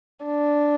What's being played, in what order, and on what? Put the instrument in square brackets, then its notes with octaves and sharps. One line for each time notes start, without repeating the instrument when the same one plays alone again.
[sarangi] D4